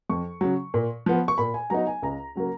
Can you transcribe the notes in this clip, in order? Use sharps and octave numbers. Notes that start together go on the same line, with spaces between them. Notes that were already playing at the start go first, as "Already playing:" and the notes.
F2 C#6
C#3 F#3
A#2
F3 B3
C#6
A#2 B5
G#5
F#3 B3 D#4 A#5
G#5
C#2 A#5
C#3 F#3 A#3